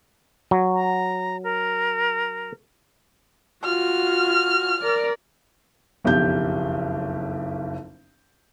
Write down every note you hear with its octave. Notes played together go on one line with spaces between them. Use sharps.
F#3
A#5
A#4
F4 F#4 F6
A#4 D5
F#1 B1 F2 G4 G6